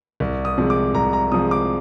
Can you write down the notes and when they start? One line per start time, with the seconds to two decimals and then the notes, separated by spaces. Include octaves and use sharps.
0.20 C2
0.45 D#6
0.58 C3 F3 G#3
0.70 D6
0.94 C2 A#5
1.13 A#5
1.32 C3 F3 G#3 D#6
1.51 D6